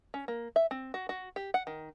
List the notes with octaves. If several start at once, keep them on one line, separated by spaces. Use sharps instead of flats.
C#4
A#3
E5
C4
F#4
F#4
G4
F#5
D#3